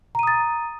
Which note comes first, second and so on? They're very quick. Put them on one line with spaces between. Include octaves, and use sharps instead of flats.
A#5 D#7 D#6 A6